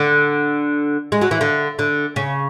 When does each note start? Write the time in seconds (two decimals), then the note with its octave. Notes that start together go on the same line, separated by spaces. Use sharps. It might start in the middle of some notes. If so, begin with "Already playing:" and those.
Already playing: D3
1.12 G#3
1.21 F#3
1.31 E3
1.41 D3
1.79 D3
2.16 C#3